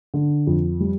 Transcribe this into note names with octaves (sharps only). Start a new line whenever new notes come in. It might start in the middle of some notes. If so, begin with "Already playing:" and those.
D3
F2
G3